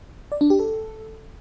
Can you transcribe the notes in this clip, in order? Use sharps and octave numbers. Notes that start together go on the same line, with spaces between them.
D5
D4
G4
A4